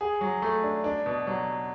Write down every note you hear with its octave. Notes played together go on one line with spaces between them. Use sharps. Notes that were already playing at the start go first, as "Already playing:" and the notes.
G#4
F#3
A3
D4
D4
B2
F#3